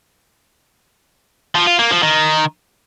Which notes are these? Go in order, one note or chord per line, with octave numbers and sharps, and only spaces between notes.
F3
F4
A#3
F3
D#3